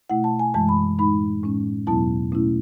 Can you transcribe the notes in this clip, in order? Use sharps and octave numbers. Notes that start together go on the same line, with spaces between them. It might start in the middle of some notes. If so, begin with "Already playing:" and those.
B2 A3 E4 F#5
A5
G#5
F#2 E3 G#3 A5
B5
A2 G#3 D#4 B5
A2 G#3 C#4
E2 B2 F#3 B3 E4 A5
B2 A3 C#4 E4